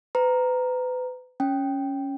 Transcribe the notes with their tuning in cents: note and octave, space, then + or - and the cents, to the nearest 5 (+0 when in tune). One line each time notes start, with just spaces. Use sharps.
B4 +35 A#5 +0
C#4 +0 G5 +0